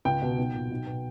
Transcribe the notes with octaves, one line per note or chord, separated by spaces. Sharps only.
C#2 G5
B2
B1
A#2
B1
B2